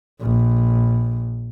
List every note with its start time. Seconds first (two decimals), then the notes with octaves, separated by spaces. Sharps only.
0.21 A#1